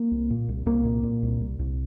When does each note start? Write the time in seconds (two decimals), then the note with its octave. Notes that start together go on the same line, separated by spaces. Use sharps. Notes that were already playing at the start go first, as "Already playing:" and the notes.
Already playing: A#3
0.11 C2
0.30 A#2
0.49 C2
0.66 C2 A#3
0.85 A#2
1.03 A#2
1.23 C2
1.41 C2
1.59 C2